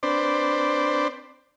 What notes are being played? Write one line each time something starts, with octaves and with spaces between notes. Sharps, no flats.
C4 D4 B4 C5 D5